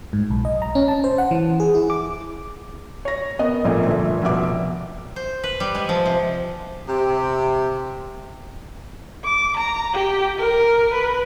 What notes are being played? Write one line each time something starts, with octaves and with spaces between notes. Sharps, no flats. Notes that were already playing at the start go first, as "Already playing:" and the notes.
G#2
B1
D#5
A#5
C#4
A5
C5
F#5
E3
G#4
E4
D6
C#5 A#6
B3 A#4 D#5
A#1 A#2 A3 A#3
G1 A#2 A3 A#4 E5
F1 B2 E5 D6
C5
B4
G3
G#3
F3
C3
C3 G4
D6
A#5
G4
A#4
B4